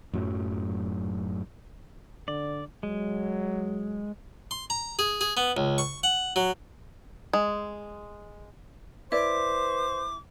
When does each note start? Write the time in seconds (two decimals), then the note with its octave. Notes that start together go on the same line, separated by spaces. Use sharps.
0.13 F#2 A2 F#3
2.28 D3 D5
2.83 F#3 G#3
4.51 C6
4.70 A#5
4.99 G#4
5.21 G#4
5.37 B3
5.57 C#2
5.78 C#6
6.03 F#5
6.36 F#3
7.33 G#3
9.12 E4 B4 C5 D5 D6